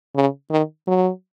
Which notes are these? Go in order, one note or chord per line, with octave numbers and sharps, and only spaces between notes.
C#3
D#3
F#3